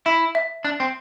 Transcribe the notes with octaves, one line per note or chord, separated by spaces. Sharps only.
E4 E5
E5
D4 F#6
C4